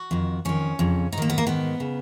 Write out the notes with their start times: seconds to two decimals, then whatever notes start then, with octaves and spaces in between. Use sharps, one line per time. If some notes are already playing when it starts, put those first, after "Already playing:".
Already playing: F#4
0.11 F2 D#3
0.45 F2 D#3 C#4
0.79 F2 C#3
1.12 G#2 D#4
1.18 D#3 A#3
1.30 B3
1.38 A#3
1.47 G#2 D#3 B3
1.80 C#3